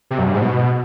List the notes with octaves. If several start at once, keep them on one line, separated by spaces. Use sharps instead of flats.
C3
F#2
G2
G#2
B2